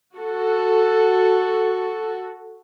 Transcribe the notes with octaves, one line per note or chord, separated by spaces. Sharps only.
F#4 A4